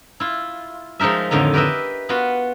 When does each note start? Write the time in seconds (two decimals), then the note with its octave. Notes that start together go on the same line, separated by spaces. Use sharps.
0.20 E4 F4
1.00 F3 G#3 D#4 A#4 E5
1.31 F2 A2 D3 D#3 D#4
1.53 G4 A#4 B4 D#5 E5
2.09 B3 F4 F#4 B4